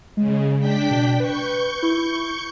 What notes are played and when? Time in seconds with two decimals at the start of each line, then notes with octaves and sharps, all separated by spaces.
0.17 C#3 G#3
0.59 D4 G5 B6
0.90 B2
1.20 B4 C#6 G6
1.83 E4